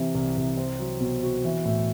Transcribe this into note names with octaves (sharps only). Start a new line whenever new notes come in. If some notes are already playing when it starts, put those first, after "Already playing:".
Already playing: C3 E3
C2
C2
C4
F#3
B2
F#4
E3
A2